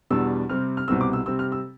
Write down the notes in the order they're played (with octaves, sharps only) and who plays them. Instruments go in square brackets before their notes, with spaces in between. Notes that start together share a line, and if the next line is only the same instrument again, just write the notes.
[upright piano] E2 B2 G3 D4 E6
C3 G3 C4 F6
F6
C2 B2 G3 C4 E6
D6
E6
C3 G3 C4 E6
F6
E6